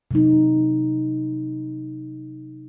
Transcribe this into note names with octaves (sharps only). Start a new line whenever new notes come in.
C3 F#3 D#4